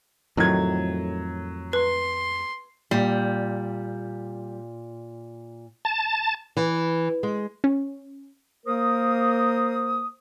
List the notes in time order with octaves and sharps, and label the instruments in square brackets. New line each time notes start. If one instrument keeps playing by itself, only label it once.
[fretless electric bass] F2 A2 D#3 [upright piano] F#3 G#6
[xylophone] B4 [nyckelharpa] C6
[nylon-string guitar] A#2 [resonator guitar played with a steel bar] G3
[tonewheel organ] A5
[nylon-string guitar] E3
G#3
[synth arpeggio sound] C#4
[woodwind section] A#3 A#4 C5 D#6